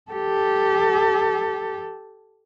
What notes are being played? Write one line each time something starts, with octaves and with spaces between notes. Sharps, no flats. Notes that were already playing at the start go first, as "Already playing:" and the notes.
G4 A4